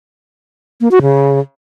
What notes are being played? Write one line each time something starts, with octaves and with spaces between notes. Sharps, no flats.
A#3
F#4
C#3